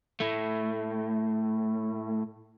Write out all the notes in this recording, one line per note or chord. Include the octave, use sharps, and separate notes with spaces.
A2 A3